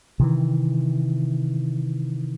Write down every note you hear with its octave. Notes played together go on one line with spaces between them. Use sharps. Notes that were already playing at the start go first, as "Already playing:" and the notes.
C3 D#3 E3